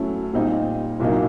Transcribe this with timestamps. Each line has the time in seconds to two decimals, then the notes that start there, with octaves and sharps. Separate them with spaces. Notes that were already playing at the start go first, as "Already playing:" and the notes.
Already playing: F#3 A3 C#4 E4
0.33 A#2 G3 C4 D#4
1.00 C2 A#2 F#3 A#3 D#4